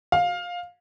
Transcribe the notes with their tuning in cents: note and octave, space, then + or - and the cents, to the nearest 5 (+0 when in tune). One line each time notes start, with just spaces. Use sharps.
F5 +15